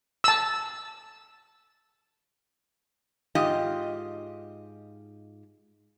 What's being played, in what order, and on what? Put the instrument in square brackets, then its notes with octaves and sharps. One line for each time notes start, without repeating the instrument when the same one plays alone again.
[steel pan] A5 E6
[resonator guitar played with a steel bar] G#2 F4 G4 D#5